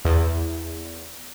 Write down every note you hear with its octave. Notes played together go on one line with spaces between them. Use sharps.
E2